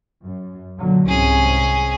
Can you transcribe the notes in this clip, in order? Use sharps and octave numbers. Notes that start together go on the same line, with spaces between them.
F#2
A#2 D3 F#3
C2 G#2 C3 C#4 G#4